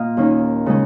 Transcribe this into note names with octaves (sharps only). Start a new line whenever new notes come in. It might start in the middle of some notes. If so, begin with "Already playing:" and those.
Already playing: A#2 D#5 F5
D#2 D#3 A#3 C#4
C#3 G#3 C#4